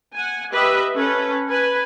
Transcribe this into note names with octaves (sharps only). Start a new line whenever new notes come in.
F#5 G#5
G4 B4 D#5 E5
C#4 A4 B4
B4 G#5